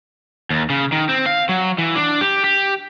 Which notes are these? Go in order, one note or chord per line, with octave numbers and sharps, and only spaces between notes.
D#2
C#3
D#3
C4
F5
F#3
E3
D4
G4
G4